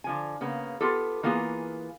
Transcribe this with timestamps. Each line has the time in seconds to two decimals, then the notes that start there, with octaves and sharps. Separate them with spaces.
0.04 D3 F3 G#5
0.41 C#3 A#3 B3
0.81 B3 F4 G4 A4
1.23 E3 A#3 B3 F4 G#4